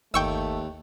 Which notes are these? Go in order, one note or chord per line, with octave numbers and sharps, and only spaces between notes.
G1 D#2 A3 G5 C#6 E6